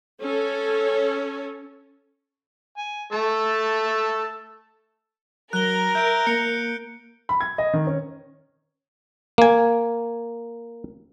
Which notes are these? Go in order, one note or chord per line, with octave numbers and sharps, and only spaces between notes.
C#4 A4 C#5
G#5
A3 A5 E6
F#3 A#4 F#6 G7
E5 G6 D7
A#3 C#7
B5
G#6
D#5
D#3
C#4
A#3 G#5